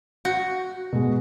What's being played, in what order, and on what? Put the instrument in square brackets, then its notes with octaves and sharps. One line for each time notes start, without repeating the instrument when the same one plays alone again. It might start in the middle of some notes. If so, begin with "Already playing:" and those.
[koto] F#4
[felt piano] B2 G#3